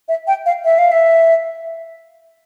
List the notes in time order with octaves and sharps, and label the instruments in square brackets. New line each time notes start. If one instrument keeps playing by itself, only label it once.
[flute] E5
G5
F5
E5
F5
E5